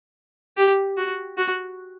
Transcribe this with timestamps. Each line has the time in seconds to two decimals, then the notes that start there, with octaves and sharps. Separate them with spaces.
0.57 G4
0.97 F#4
1.38 F#4